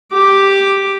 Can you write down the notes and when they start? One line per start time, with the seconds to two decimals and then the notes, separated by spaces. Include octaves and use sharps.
0.13 G4 D6